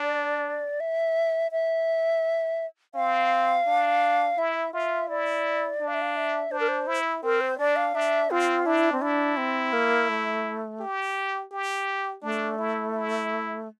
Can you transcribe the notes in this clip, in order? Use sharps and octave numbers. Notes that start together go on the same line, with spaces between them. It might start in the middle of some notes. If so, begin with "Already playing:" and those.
Already playing: D4 D5
E5
E5
C4 F5
D4
E4 E5
F4 E5
E4 D5
D4
F5
E5
F5
E5
D4 C5
A#4
C5
E4
C4 A#4
C5
D4 D5
F5
D4 E5
C4 F4
D4 E4
C4
D4 E4
C4
A#3
A3
G4
G4
A3 D4
E4
E4